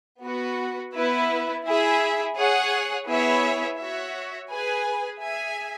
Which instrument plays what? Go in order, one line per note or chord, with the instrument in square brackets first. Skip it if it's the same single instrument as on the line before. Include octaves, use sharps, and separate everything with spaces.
[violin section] B3 F#4 B4
B3 E4 B4 E5
E4 G#4 E5
G#4 C#5 F#5
B3 E4 G#4 C#5 E5
F#4 C#5 E5
G#4 B4 G#5
G#4 E5 G#5